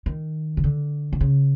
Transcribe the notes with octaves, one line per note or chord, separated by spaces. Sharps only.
D#3
C#3
D3
C3
C#3